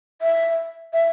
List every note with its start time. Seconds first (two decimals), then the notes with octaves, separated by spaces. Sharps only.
0.22 E5
0.93 E5